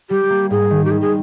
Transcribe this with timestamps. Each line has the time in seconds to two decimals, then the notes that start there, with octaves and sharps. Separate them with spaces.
0.10 G3 G4
0.30 A#3
0.51 G#2 G#4
0.71 D#3
0.85 G4
0.91 G3 G#4
1.01 G#4